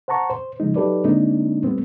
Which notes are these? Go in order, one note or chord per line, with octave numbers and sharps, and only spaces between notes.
C5 F#5 A5 A#5 C#6
C5
C#3 F3 G#3 D#4
F#3 D#4 G4 A4 B4 D5
D3 G#3 A#3 C4 D4 D#4
G3 A3 B3 C4